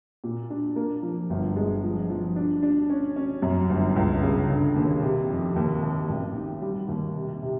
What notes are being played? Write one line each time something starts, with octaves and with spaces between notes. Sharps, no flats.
A#2
D4
A#3
F3
G1
G#3
F3
F3
D4
D4
C#4
C#4
F#2
G1
C#2
C#3
D3
D#2
C3
F2
D#2
D#2
A1
D#3
G3
D#2
C3
C3